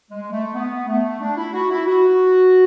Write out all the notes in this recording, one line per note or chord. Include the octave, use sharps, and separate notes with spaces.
G#3
A3
B3
A3
D4
E4
F#4
E4
F#4